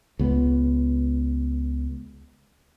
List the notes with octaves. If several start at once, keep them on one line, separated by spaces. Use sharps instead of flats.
C#2 B3